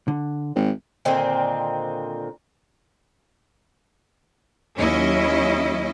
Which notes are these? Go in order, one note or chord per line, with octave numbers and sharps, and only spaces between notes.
D3
G#1
A#2 D3 D#3 C4
D#2 F#3 C#4 E4 D#5